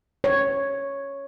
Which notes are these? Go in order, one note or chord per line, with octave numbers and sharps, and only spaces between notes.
C#5